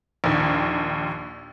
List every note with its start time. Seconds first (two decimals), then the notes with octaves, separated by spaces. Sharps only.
0.24 A#1 D#2